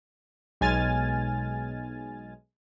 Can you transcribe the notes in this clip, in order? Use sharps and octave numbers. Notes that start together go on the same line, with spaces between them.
B1 G#3 G#5 F6 A6